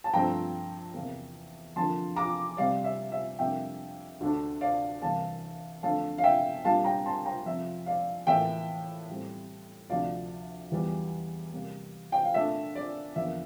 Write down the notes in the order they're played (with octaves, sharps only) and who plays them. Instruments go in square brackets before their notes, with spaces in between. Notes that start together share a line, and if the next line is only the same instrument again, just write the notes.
[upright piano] A5
G2 F3 A3 C4 G5 A#5
E2 C3 E3 A#3
F2 D3 F3 A#3 A5 C6
A#5 D6
C3 G3 C4 D5 F5
E5
E5
F2 C3 G3 A#3 D4 E5 G5
D2 D3 A3 D4
D5 F5
C2 C3 E3 A#3 F5 A5
F2 D3 A3 D4 F5 A5
F5
E5 G5
A#2 G3 A#3 D4 F5 A5
G5 A#5
A5 C6
G5 A#5
F2 C3 F3 E5
D5 F5
A2 E3 A#3 E5 G5
A2 G3 C4
D2 C3 F3 D5 F5
E2 E3 G3
C3 G3 A#3
G5
F5
A#2 A3 D4 E5
D5
E2 D3 F3 A#3 E5